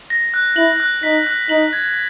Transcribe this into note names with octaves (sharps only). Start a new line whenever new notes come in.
A#6
F#6
E4 F#7
F#6
D#4 B6
F#6
D#4 F#7
G#6